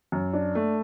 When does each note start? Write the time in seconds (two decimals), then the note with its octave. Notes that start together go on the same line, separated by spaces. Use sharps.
0.12 F#2
0.33 D4
0.55 A3